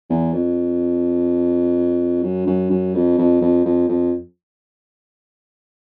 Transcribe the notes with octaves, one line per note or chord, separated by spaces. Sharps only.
E2
F2
F#2
F#2
F#2
F2
F2
F2
F2
F2